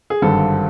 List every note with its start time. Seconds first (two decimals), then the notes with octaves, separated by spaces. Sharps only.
0.10 G#4
0.22 G#1 G2 D3 A4